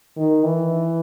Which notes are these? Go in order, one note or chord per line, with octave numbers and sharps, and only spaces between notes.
D#3
E3